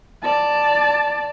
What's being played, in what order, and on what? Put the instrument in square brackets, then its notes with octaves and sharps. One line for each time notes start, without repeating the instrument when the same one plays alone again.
[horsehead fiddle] D5 A5